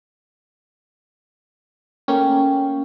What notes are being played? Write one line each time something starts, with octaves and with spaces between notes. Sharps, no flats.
A3 A#3 C#4 G5